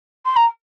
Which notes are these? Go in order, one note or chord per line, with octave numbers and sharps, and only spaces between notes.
C6
A#5